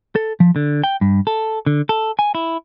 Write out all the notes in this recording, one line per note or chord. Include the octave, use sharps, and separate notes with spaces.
A4
F3
D3
G5
G2
A4
D3
A4
G#5
E4